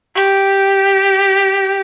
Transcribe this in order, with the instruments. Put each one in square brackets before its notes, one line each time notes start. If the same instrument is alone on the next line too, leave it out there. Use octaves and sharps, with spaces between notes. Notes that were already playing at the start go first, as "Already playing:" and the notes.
[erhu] G4